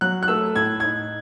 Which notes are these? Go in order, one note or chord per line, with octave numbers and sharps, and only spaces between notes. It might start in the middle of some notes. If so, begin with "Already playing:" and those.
F#3 F#6
F#6
A3 E6
A2 G#6
D#4 G#6